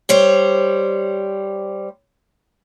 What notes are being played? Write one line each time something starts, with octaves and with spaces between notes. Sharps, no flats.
G3 C5 C#5